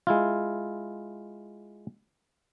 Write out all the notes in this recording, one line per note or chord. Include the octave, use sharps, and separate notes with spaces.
G#3 E4 F4